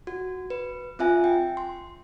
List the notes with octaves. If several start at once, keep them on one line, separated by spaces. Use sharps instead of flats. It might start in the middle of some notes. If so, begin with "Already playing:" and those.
F#4
B4
C4 F4 E5 G#5
G5
C6